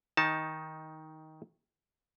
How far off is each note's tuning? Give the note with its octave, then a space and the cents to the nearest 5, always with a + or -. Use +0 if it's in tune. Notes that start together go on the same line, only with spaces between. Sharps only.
D#3 +15 D#4 +10 A5 +0